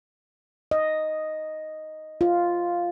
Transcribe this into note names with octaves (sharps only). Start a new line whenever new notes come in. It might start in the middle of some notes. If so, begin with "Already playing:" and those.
D#5
F4